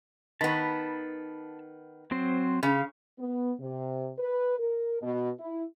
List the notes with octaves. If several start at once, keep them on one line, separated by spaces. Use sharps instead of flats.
D#3 B3 A5 B5
F#3 C4 C5
C#3 F5
B3
C3
B4
A#4
B2
E4